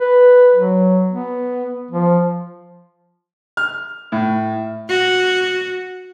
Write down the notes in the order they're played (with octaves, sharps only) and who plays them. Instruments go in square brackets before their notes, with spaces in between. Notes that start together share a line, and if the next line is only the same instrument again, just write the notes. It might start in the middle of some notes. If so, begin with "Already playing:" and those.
[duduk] B4
F#3
B3
F3
[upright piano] F6
A2
[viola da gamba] F#4